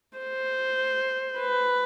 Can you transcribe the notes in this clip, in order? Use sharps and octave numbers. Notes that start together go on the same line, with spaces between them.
C5
B4